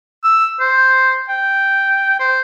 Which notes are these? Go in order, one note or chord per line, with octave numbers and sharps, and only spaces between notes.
E6
C5
G5
C5